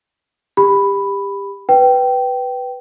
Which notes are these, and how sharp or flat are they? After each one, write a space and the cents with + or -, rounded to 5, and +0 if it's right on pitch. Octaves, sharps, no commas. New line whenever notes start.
G4 +25 B5 +0
B4 +0 G5 -15